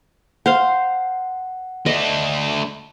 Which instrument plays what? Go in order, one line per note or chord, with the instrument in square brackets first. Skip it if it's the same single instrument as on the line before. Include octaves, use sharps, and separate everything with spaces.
[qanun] C5 F5 C6 [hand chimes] F#5
[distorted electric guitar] A3 D4 [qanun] D#5